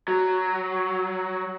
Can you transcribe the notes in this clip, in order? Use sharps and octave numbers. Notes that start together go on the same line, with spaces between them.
F#3